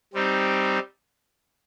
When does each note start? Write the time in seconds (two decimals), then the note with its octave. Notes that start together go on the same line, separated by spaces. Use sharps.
0.14 G3 C4 D#4